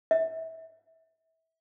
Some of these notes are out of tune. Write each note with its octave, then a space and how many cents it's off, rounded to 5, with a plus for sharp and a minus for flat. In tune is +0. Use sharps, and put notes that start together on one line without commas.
E5 -30